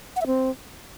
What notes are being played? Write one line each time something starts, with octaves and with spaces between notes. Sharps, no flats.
F#5
E5
C4